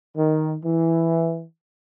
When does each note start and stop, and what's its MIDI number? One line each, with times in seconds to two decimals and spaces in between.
0.16 0.55 51
0.64 1.43 52